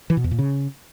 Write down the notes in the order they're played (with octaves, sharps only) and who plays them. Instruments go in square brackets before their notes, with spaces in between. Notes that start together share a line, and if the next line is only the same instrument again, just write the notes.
[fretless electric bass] E3
B2
E2
A#2
C#3